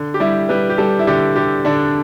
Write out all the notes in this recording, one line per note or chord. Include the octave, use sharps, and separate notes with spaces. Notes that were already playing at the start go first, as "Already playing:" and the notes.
Already playing: D3
G4
G3 E4
G3 B4
G4
G3 A4
E4
D3 G4
D3 G4
D3 D4